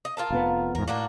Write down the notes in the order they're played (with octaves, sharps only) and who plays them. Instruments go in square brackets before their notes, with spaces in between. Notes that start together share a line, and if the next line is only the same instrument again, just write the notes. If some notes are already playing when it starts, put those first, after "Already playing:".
[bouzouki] D#5
F4 A#4 A5
[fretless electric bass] F1 F2 B3
[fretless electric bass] E2 G#2 [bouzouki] A#4
[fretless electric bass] A2 [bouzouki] A#3 D4 F#4